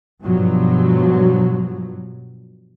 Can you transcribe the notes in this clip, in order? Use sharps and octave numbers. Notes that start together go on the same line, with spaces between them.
G2 B2 F3 F#3